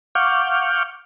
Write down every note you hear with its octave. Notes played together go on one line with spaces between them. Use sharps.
F5 F#5 C#6 D6 F6 G6